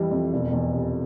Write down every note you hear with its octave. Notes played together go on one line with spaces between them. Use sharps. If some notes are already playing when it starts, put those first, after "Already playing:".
Already playing: F2 E3 G3
F2
E1
E2
C3